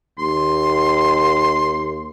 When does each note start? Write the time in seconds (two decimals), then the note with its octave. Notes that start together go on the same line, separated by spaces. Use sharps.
0.19 D#2 C6